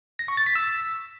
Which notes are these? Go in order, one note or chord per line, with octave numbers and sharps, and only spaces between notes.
A#6
C#6
A6
B6
E6